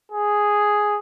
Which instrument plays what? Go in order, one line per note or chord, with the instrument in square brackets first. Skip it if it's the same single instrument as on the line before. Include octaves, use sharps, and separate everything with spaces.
[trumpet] G#4